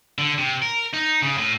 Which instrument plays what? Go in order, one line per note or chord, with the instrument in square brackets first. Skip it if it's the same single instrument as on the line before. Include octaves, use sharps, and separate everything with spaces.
[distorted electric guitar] D3
C3
A#4
D#4
C#3
A2